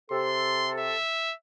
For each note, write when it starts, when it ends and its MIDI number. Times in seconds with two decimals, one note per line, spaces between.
0.11 0.97 48
0.11 0.97 69
0.11 0.72 84
0.79 1.34 76